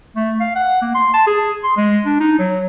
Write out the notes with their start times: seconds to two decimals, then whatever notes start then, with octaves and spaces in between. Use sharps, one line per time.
0.16 A3
0.40 F5
0.56 F#5
0.82 A#3
0.95 C6
1.14 A5
1.27 G#4
1.64 C6
1.77 G#3
2.06 D4
2.20 D#4
2.39 F#3